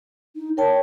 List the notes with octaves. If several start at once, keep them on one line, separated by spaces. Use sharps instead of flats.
D#4
A#4 C#5 G5 A5